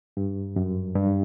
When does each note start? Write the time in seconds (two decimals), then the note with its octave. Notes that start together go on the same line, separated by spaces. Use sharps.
0.17 G2
0.56 F#2
0.96 G2